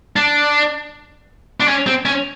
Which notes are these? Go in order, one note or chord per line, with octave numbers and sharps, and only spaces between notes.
D4
D4
C#4
C4
C#4